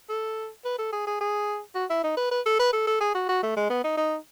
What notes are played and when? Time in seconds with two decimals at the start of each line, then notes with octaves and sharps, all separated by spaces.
0.09 A4
0.65 B4
0.78 A4
0.92 G#4
1.07 G#4
1.21 G#4
1.75 F#4
1.90 E4
2.04 D#4
2.17 B4
2.31 B4
2.45 A4
2.59 B4
2.73 A4
2.87 A4
3.00 G#4
3.15 F#4
3.29 F#4
3.43 A3
3.57 G#3
3.70 B3
3.84 D#4
3.97 D#4